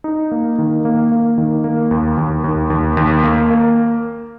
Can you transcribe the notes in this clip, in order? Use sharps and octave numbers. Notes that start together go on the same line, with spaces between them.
D#4
A#3
D#3
A#3
A#3
D#3
A#3
D#2
D#2
D#2
D#2
D#2
A#3
A#3